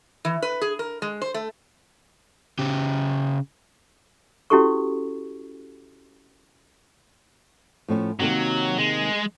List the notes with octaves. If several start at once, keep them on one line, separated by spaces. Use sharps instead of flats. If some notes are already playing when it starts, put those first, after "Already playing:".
E3
B4
G#4
A#4
G#3
C5
A3
C#3 G4
C#4 E4 F#4 G4 A4 C#6
A2 F3 C#4
C3 D#3 F#3 A#3
G#3